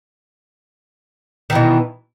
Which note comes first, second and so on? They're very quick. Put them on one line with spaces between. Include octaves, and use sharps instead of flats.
D#3 E3 B2